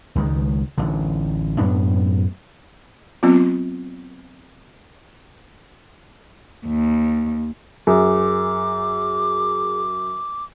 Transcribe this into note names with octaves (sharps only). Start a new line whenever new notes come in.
C#2 D#3 G#3
A1 D3
F#2 A2 B3 D4
F#3 B3 C4 F4
D#2
F#2 G#4 D6